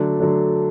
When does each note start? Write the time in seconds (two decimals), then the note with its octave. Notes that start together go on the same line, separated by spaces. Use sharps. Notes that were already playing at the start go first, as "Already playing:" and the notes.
Already playing: D3 F#3 A3 D4
0.20 D3 F#3 A3 D4